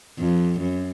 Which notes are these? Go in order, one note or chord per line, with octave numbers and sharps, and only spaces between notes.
F2
F#2